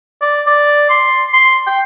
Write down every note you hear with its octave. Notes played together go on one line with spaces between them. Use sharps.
D5
D5
C6
C6
G5